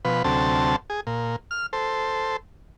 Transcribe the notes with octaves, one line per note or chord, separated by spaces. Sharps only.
B2 F3 B4
D2 C3 F#3 C4 A4 A5
G#4
A#2
F6
A4 C5